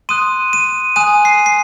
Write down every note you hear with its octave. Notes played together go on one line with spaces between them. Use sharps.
C6 D#6 F#6 D#7
D#7
G#5 D#6 F#6 D#7
C7
C7